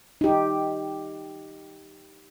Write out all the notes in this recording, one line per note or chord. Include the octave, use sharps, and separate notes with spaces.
D#4 G4